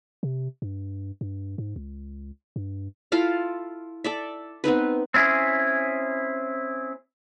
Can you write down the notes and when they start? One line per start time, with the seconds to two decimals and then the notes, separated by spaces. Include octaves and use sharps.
0.23 C3
0.62 G2
1.21 G2
1.58 G#2
1.76 C#2
2.56 G2
3.12 E4 F4 A4 F5
4.04 A4 D5 E5
4.64 B3 C4 D#4 B4
5.14 C4 C#4 E4 G#4